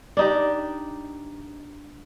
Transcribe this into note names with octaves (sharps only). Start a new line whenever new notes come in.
D4 D#4 G4